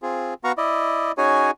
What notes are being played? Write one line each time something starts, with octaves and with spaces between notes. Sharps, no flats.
C4 F4 G#4
B3 F#4 F5 A#5 C#6
E4 D5 D#5
C#4 D#4 F#4 G#4 C#5 G#5